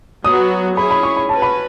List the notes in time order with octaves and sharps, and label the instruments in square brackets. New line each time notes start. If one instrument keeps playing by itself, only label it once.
[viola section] F#3 B3 F#4 [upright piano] D#6
[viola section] C#4 E4 G#4 C#5 [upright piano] B5
[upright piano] B5
C#6
B5
[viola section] C#4 F#4 B4 [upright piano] A5
[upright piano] B5